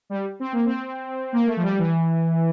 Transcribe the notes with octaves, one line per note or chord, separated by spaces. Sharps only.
G3
C4
A#3
C4
A#3
A3
F3
G3
E3